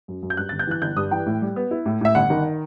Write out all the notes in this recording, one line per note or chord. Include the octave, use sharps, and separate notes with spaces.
F#2
F#2
G6
G2 F#6
A6
G1
G6
E3 F#6
G1 G6
G2 D#6
E3 G5
A2
G3
B3
E4
A2
A2 E5
G1 F#5
D#3